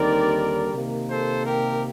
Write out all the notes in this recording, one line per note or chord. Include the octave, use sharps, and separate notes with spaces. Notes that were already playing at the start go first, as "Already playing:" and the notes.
Already playing: D#2 D3 G3 C4 D#4 A#4 D5
C3 D#3 A#3
A4 C5
G4 A#4